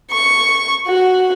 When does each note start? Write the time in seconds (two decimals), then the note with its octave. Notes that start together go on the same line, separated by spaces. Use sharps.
0.11 C#6
0.87 F#4